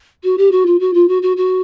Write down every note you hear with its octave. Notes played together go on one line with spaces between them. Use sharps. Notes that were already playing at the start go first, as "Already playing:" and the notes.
F#4
G4
F#4
F4
F#4
F4
F#4
F#4
F#4